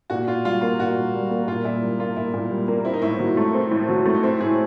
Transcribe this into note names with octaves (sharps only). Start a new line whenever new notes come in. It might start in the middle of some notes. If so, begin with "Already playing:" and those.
A#2 F#4
A#2 F4
G3 F4
A#3 F4
A#2 F#4
A#2
G3
A#3
A#2 F4
A#2 E4
G3
A#3 F4
A#2 E4
A#2
G3
A#3
C4 E4
D#4
A2 E4
F#3
A3
C4
A2
F#3
A3
D#4
C4 E4
A2 G#4